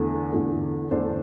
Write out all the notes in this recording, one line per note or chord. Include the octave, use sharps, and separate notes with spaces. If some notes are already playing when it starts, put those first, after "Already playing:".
Already playing: E2 D3 A3
E2 D3 A3
E2 D3 A3 D4 A4 C5